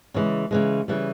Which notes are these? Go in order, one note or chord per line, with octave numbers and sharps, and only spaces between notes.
C#3 E3 G#3
C#3 E3 G#3
C#3 E3 G3